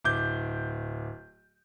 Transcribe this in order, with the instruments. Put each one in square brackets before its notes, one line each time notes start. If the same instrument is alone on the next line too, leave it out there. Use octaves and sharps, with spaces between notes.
[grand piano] D1 D6 G6